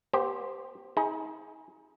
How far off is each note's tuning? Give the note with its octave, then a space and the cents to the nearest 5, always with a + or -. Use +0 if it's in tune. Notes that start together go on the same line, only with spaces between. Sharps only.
B3 -35 G4 +0 C5 +0
D#4 +35 G#4 +0